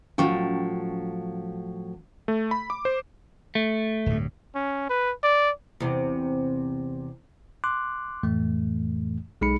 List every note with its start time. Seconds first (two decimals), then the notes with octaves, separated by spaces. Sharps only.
0.18 A2 F3 F#3 C#4 G5 C#6
2.28 A3
2.51 B5
2.70 D6
2.85 C5
3.55 A3
4.06 D1 G2
4.55 C#4
4.90 B4
5.23 D5
5.80 E2 C3
7.64 C6 D6 F#6
8.23 F2 A2 E3 A3
9.41 B1 G#3 D#4 G#4 B5 C#7